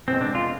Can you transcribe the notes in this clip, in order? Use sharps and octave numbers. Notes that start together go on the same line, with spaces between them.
F1 E2 B2 G#3 C4
D4
F4